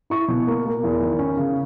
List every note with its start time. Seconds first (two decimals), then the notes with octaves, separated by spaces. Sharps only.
0.10 E4 C#6
0.28 B2
0.47 A#3
0.65 A#3
0.83 E2
1.01 D#3
1.19 C#4
1.37 C#3